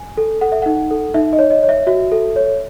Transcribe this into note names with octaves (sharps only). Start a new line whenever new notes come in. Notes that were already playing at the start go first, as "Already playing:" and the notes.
Already playing: G#5
A4
A4 F#5
E5
D#4 F#5
A4
D#4 E5
D#5
C#5
D#5
C#5
E5
F#4 E5
A4
C#5